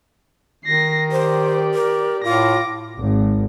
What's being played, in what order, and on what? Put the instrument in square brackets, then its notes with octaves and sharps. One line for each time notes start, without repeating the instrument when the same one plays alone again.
[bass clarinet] D#3 [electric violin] A#6 C7
[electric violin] G4 D5 [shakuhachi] C5
[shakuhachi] A#4
[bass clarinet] A2 [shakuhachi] F4 [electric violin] D6 A#6
[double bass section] G#1